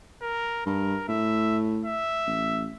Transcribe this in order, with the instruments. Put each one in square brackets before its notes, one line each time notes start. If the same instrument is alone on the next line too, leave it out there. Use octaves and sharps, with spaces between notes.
[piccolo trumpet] A#4
[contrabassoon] G2 [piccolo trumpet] A#4
[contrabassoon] A2 [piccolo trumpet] E5
[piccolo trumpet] E5
[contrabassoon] A1